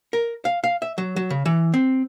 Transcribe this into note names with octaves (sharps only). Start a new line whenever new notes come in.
A#4
F5
F5
E5
F#3
F#3
C#3
E3
C4